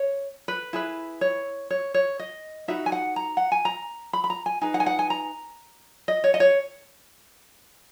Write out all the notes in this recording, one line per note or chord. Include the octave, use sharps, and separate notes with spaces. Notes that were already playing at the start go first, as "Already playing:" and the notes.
Already playing: C#5
B4
E4 G#4 B4
C#5
C#5
C#5
D#5
D#4 F#4 B4 E5
G#5
F#5
A#5
F#5
G#5
A#5
B5
B5
A#5
G#5
D#4 G#4 B4 G#5
F#5
G#5
F#5
G#5
A#5
D#5
C#5
D#5
C#5